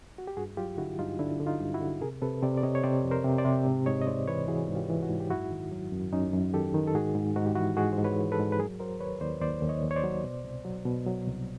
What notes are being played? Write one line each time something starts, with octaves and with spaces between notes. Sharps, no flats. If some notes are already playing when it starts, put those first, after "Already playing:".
F#4
G4
G2 F#4 G#4
F#3 F4 G4
D3 E4 F#4
G2 D#4 F4
D3 D4 E4
D3
D#4 F4
G2
E4 F#4
D3
C3 G#4 A#4
C3 A4 B4
C3 C5 D5
D5
C3 C#5 D#5
C#5
C3 C5 D5
F2
A#4 C5
C3
C5 D5
C3
G#2
G#2 C#5 D#5
D#5
G#2 C5 D5
E3 B4 C#5
E3 F#4 G#4
G#2
F4 G4
E3
E4 F#4
G#2
G4
F#2 E4 F#4
D#3
F#3
F#2
F#2 C#4 D#4
F#2
D#3 G4 A4
D#3
A4
G#2 F#4 G#4
G#2
G#2 F#4
G4
E3 E4 F#4
G#2 F#4 G#4
C5
G#2
B4 C#5
E3
A4 B4
G#2
B4
F#3 G#4 A#4
F#3 A#4 C5
D#2 B4 C#5
D#2 C5 D5
D#2 C5 D5
D#2
C#5 D#5
D#2
C#5
C5 D5
F#3
B2
C2
F#3
B2
F#3
C2